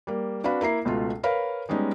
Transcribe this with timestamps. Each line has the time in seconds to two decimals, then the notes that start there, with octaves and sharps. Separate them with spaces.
0.07 G3 A#3
0.44 C4 D4 F#4 B4 F5 B5
0.61 A#3 E4 A#5 C7
0.85 C#2 B2 A3 F4
1.23 A#4 B4 C#5 F5 B5
1.69 G3 G#3 B3 C#4 D#4